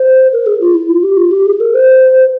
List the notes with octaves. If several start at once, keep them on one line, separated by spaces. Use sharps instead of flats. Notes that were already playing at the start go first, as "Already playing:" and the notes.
Already playing: C5
A#4
G#4
F4
E4
F4
G4
F4
G4
G#4
A#4
C5